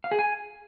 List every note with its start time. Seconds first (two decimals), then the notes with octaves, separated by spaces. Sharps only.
0.04 F5
0.11 G#4
0.19 G#5